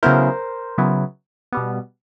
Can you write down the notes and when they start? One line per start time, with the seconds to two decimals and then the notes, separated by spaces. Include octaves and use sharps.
0.03 C#3 F#3 B3 E4 A#4 C5
0.78 C#3 F#3 B3 E4
1.52 B2 G3 B3